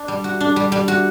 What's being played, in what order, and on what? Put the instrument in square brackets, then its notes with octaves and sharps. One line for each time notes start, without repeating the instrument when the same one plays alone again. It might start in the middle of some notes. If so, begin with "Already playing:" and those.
Already playing: [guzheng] D4
G3
F#4
D4
G3
G3
F#4